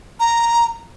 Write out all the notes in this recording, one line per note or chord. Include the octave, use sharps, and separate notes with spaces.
A#5